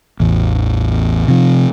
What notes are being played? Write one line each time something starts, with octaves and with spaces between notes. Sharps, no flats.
A1 E2
C3 F3